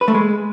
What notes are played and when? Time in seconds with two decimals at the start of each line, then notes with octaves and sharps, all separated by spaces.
0.01 B4
0.08 A3
0.14 G#3